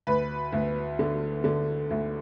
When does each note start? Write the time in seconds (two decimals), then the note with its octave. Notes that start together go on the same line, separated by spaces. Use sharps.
0.07 D2 B4
0.53 D2
0.99 D3
1.44 D3
1.90 D2